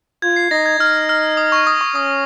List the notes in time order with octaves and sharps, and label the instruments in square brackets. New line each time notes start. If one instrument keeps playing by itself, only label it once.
[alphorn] F4 [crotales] G#6
[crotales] C7
[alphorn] D#4 [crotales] A#6
[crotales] G#6
[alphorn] D#4 [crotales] F6
[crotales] F6
D#6
C#6
D#6
C#6
[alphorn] C#4 [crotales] D#6